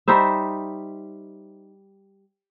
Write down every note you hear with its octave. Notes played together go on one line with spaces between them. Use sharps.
G3 D#4 C5 E5